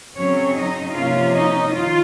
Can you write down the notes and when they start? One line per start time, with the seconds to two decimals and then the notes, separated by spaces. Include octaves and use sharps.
0.17 C#3 F#3 C4 C#4 C#5
0.57 D#4 D#5
0.95 C3 F3 A#3 C#4 F4 F5
1.35 D#4 D#5
1.73 D#3 F4